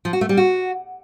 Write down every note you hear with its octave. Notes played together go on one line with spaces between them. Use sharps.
F3
F#4
A3
G3
F#4